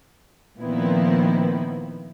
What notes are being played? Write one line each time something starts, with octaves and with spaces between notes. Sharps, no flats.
A#2 D#3 F3 B3 C4 E4